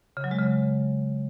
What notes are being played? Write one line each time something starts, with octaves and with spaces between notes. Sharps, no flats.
C#3
F#3
G#3
C#3